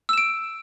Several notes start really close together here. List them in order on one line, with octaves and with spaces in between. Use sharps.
E6 E7 D7